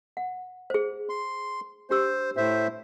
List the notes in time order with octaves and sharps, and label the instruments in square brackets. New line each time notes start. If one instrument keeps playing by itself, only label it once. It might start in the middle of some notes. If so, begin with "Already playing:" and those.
[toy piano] F#5
G#4 C5
[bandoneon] C6
[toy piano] D4 G4 E6 [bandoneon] C5
[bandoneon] A2 C5 E5